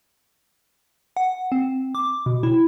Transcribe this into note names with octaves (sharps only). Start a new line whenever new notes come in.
F#5
C4
D6
B2
E4